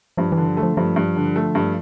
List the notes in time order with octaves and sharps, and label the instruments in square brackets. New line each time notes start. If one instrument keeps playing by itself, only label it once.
[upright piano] G2 [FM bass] F3
[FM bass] E3
[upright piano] D3
[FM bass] F3
[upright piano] A3
[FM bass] F3
[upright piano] G2 [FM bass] F3
[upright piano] G2
D3
A3
G2